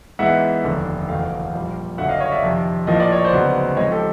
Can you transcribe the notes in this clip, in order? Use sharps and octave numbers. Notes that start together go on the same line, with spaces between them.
G#2 E3 G#3 B3 E5 F#5
F1 D#2 D3
F#1 E2 B2 F#3 A3 F5 G5
A#1 A#2 G3
F#1 F#2 D3 F#3 E5 F#5
D#5 F5
C#5 D#5
D5 E5
F2 C3 D#3
A#1 A2 F3 A#3 D#5
D5
C#5
C5 D5
D2 C#3 F#3 B3 D#4
G#2 F3 A3 C4 D#4 C#5 D#5
G4 A4